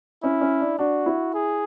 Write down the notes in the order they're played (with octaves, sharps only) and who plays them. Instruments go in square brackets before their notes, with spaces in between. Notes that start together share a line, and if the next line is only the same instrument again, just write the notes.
[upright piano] C#4 [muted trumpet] E4
[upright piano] C#4
D4
[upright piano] D4 [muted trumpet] F#4
[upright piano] E4
[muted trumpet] G#4